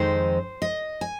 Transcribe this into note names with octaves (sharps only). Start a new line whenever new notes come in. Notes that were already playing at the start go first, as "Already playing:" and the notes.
Already playing: F2 D#3 G#3 C4 D#4 C5
D#5
G#5